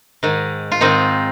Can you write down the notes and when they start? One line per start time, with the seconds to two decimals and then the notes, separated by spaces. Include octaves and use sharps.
0.23 G#2 D#3
0.72 F4
0.81 G#2 D#3 C4 D#4